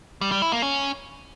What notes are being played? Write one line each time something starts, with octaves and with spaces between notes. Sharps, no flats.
G3
G3
E4
A#3
C#4